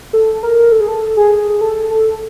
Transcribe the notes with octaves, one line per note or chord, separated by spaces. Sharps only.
A4
A#4
A4
G#4
A4
G#4
G#4
A4
A4